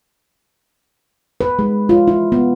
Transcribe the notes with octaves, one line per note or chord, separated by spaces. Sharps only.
B4
G#3
F4
E4
B3